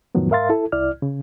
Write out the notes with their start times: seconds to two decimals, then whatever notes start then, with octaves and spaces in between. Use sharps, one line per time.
0.15 F2 A2 D#3 F3 F#3 B3
0.30 G#2 A#4 E5 F5 C6 A6
0.49 E4 A4
0.72 C2 E4 D5 F6
1.02 C#3